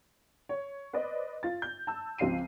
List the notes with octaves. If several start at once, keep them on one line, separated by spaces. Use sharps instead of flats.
C#5
B4 C5 D5 D#5
F4 A6
G6
A5 E6
C#2 F3 C4 F5 C7 D#7